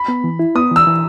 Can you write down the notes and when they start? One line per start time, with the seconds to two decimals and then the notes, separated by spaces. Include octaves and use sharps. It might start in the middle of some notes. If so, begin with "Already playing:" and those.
Already playing: B5
0.08 B3
0.24 E3
0.39 E4
0.55 B3 D#6
0.71 E3 E6
0.87 E3